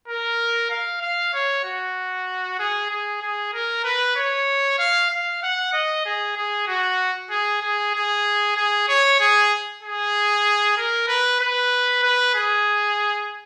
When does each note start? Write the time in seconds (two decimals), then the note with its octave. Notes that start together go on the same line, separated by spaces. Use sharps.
0.08 A#4
0.70 F5
1.02 F5
1.34 C#5
1.64 F#4
2.59 G#4
2.90 G#4
3.22 G#4
3.54 A#4
3.84 B4
4.16 C#5
4.79 F5
5.11 F5
5.43 F#5
5.73 D#5
6.06 G#4
6.37 G#4
6.67 F#4
7.30 G#4
7.62 G#4
7.94 G#4
8.57 G#4
8.88 C#5
9.20 G#4
9.83 G#4
10.78 A#4
11.08 B4
11.40 B4
12.03 B4
12.35 G#4